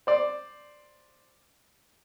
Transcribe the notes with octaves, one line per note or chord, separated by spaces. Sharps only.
C5 D5